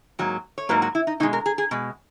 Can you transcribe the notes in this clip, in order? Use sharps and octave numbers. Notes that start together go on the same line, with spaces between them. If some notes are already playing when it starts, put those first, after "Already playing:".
G#2 F#3 A#3
C#5
G#2 F#3 A#3 B4
F#4
E4
D#4
B2 G#3 D#4
A#4
G#4
G#4
B2 G#3